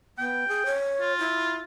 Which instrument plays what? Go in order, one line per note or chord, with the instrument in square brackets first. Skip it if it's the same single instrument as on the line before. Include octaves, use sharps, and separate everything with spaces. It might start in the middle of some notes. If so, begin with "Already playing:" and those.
[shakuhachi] B3 [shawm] G5
[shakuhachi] G#4
C#5
[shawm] F4
[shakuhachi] E4